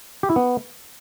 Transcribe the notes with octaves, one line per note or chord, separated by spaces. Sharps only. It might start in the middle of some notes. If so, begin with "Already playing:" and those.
G4
E4
B3